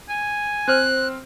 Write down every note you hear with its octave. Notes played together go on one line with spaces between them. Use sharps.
G#5
C4 C5 F6 F#6